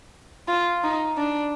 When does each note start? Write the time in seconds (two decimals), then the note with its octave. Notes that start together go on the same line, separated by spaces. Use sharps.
0.48 F4
0.84 D#4
1.18 D4